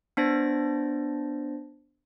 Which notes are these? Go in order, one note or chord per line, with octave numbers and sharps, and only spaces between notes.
B3 D4 C5 A6 A#6